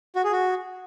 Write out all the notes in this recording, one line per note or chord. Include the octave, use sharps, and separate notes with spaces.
F#4
G#4
F#4